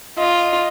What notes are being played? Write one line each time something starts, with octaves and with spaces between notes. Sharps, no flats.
F4 D#5